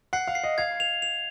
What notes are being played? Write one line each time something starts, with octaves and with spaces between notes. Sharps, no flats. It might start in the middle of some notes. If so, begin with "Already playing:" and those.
F#5 C7
F5
C7
D#5
F5 G#6
F7
F7